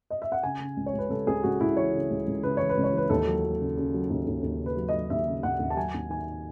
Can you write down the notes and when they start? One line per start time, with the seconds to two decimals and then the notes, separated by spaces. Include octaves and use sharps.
0.10 D#5
0.22 E5
0.32 F#5
0.43 C#3 G#5
0.60 C#3
0.77 C#2
0.86 C#5
0.93 C#2
0.99 B4
1.10 C#2 A4
1.27 C#2 G#4
1.43 C#2 F#4
1.60 C#2 E4
1.77 E3 C#5
1.93 C#3
2.11 C#2
2.27 C#2
2.43 C#3 B4
2.57 E3 C#5
2.70 B4
2.77 C#2
2.84 C#5
2.93 E3 B4
3.10 D#2 A4
3.26 F#3
3.44 F#3
3.60 C#3
3.77 C#3
3.94 F#3
4.10 D#2
4.27 D#2
4.43 D#2
4.60 C#3
4.66 B4
4.77 F#3
4.89 D#5
4.93 F#3
5.10 D#2 E5
5.26 C#3
5.43 D#2 F#5
5.60 D#2
5.70 A5
5.76 F#3 G#5
5.94 D#2
6.10 D#3 G#5